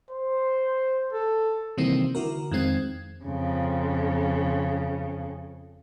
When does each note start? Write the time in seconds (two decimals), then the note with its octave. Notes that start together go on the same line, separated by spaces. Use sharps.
0.10 C5
1.13 A4
1.77 C3 D#3 E3 G3 A#3 C4
2.15 D3 E4 F#4 A#4
2.51 F2 D#3 G#3 C4 G#6
3.24 F2 C#3